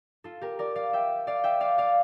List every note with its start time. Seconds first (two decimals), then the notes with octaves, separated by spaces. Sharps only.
0.24 F4 A4
0.41 G4 A#4
0.59 A#4 D5
0.76 D5 F5
0.93 E5 G5
1.27 D5 F5
1.44 E5 G5
1.60 D5 F5
1.78 D5 F5